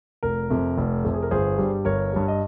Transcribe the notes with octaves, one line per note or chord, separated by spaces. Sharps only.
F1 A#4
F2 C3
F1
F2 C3
G#4
A#4
G1 G#4 C5
G2 G3
G1 A#4 C#5
G2 G3
D#5